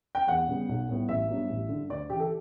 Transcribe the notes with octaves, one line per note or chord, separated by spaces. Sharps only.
G5
E2 F#5
C#3 G3 B3
B1
A2 G3 B3
A1 E5
G2 F#3 B3
A1
D3
G2
D2 D5
C#3 E3 G4
A4